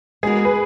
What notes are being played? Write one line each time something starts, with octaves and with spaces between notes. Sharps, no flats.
G#3 B3 F#4 G#4 A#4
B4